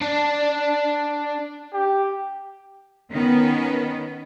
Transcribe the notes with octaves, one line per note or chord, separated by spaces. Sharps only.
D4 D5
G4
D#3 B3 C#4